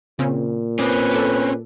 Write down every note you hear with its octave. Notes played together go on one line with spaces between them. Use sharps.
A#2 C#3 C4 C#4
C4 C#4 B4 D6 D#6
A4 D6